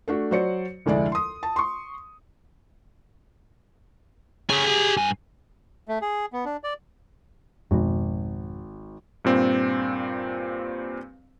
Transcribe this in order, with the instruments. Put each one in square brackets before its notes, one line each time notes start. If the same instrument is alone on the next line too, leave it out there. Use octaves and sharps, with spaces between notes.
[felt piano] A3 D4 F#4
F#3 F#4 C5 D5 C#7
F1 D2 G#3 E4 D5
C6 D#6
A5
C6 C#6
[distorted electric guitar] G4 G#5 [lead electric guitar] G#4 C#5
[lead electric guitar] G#4
G2 G#5
[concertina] A3
G#4
B3
D4
D5
[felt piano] G#1 [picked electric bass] F2 G#2 B2
[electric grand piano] G2 A#2 C4